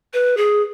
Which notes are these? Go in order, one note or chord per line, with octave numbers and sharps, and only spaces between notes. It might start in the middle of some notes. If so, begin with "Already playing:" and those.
B4
G#4